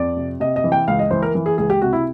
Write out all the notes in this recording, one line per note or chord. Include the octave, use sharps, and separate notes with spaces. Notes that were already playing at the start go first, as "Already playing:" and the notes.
Already playing: F2 D5
C3
C3 D#5
D#5
E3
G5
C#2 F5
D#5
E3 C5
A#4
E3
G#4
C#2 G#4
G4
C3 F#4
E4